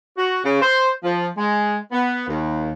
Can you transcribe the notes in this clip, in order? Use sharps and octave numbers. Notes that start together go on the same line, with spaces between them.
F#4
C#3
C5
F3
G#3
B3
D#2